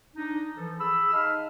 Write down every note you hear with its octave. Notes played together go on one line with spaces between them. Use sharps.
D4 D#4
E3 F3 A4
G#4 B5 E6
D#4 D#5 F5 A5 B5 F6